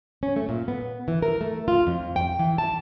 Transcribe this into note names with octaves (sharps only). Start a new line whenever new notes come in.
C#4
A3
A#2
B3
E3
A#4
A3
F4
F2
G5
E3
A5